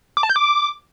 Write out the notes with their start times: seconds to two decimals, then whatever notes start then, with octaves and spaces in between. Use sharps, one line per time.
0.17 D6
0.23 A5
0.30 G6
0.36 D6